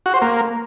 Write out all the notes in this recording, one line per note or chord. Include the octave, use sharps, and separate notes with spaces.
F#4
C5
A#3